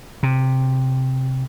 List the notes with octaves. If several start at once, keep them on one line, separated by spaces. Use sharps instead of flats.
C3